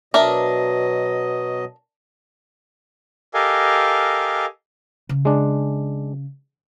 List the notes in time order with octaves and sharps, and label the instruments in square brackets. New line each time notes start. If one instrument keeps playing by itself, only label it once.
[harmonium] B2 F#3 D#5 [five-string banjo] D4 A#4 E5
[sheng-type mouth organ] G4 A4 A#4 D#5 F5 G#5
[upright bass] C#3
[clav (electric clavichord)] G#3 D4